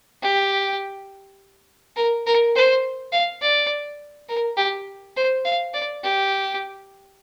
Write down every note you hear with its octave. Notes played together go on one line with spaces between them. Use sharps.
G4
A#4
A#4
C5
F5
D5
A#4
G4
C5
F5
D5
G4